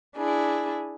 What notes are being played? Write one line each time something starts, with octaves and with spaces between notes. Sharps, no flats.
D4 E4 G#4